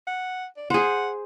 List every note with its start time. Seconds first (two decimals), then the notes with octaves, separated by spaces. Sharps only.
0.07 F#5
0.57 D5
0.70 G#4 C5 F#5